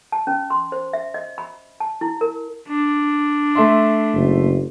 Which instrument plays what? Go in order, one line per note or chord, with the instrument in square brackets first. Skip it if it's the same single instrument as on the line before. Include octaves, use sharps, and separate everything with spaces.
[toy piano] A5
C#4
C6
C5
E5
D#5
B5
A5
E4
A#4
[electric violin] D4
[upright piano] A3 E5 C6
[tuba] F#1